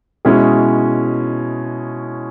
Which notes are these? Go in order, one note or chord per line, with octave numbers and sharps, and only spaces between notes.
B2 G#3 C#4 E4 G#4